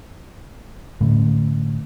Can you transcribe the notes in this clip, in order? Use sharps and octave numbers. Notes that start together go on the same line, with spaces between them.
A2 D3 A3 C#4